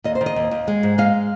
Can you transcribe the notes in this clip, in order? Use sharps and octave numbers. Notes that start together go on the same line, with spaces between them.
D#2 D#5
C5
D#3
D#5
D#2
D#2
G#3
G#2
G#3 F5